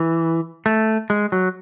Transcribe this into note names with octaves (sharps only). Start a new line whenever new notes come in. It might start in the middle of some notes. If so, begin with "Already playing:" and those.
Already playing: E3
A3
G#3
F#3